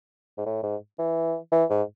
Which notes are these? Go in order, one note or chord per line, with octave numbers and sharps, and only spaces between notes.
G#2
A2
G#2
E3
E3
G#2